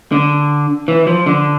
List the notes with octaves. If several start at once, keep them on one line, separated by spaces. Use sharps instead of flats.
D3
E3
F3
D3